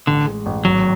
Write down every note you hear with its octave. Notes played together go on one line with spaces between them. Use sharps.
A1 D3
G#3
A1
G#1 F#3